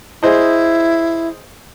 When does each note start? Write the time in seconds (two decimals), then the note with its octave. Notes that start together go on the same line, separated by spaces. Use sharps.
0.23 E4 G#4 C5 D#5